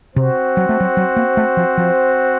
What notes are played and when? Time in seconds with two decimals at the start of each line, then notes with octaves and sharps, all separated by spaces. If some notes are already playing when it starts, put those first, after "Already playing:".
0.16 C3 C4 F#4 C5
0.57 F#3
0.69 A3
0.80 F#3
0.97 F#3
1.17 A#3
1.37 A3
1.57 F3
1.77 F3